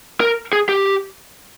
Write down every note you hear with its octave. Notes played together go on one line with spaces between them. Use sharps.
A#4
G#4
G4